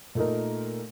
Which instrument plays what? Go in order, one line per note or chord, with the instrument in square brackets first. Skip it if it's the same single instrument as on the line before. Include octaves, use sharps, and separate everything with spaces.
[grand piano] A#2 A3 D#4 A#4